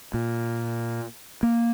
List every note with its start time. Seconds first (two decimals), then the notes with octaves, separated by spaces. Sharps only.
0.14 A#2
1.43 A#3